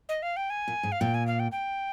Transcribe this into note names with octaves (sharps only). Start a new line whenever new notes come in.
D#5
F5
G5
G#5
A#2
G#2
F5
A#2 G5
G#5
F5
G5
G5